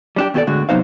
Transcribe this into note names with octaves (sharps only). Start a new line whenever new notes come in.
G3 D4 G4
D#2 B2 E4 G4 A4 D5
A2 D3 G#3 F#4
C3 F#3 B3 D#4 C5 F5